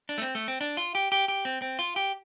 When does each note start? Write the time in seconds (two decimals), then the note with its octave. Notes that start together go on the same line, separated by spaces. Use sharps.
0.09 D4
0.18 A3
0.22 C4
0.35 A3
0.48 C4
0.61 D4
0.77 F4
0.95 G4
1.12 G4
1.28 G4
1.45 C4
1.62 C4
1.79 F4
1.96 G4